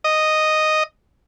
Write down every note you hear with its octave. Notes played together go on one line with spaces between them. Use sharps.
D#5